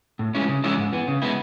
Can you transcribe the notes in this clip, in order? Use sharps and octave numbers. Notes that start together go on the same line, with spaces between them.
A2
G#3 C#4 E4
C#3
E3 G#3 C#4 E4
G#2
E3 B3
C#3
G#3 B3 E4